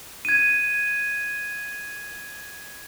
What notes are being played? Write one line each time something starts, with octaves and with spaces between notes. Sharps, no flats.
G#6 D#7